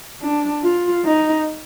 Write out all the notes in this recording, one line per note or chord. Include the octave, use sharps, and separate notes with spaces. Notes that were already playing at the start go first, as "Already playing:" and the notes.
D4
F4
D#4